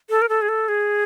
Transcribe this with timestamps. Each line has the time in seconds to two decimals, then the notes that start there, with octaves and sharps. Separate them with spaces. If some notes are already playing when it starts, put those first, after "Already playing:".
0.10 A4
0.21 A#4
0.29 A4
0.42 G#4
0.49 A4
0.68 G#4